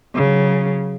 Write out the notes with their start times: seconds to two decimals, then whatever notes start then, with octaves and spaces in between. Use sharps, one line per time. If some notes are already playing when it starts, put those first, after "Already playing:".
0.15 C#3 F#3